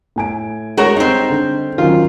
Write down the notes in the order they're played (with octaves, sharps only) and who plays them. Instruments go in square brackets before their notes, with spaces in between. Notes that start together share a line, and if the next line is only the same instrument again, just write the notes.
[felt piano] A2 G#5 D7
[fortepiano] G#3 [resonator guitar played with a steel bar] F#4 A#4 C#5
[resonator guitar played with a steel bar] G3 C4 [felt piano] D#4
[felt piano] D3
[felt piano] D#3 F#3 C#4 [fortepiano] F4